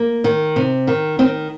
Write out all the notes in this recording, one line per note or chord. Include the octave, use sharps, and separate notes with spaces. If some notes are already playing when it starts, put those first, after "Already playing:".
Already playing: A#3
D#3
C3
D#3
D#3 C4